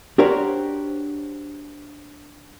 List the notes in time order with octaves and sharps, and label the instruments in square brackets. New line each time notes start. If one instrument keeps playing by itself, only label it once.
[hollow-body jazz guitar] D4 F#4 G4 A#4 C5 C#5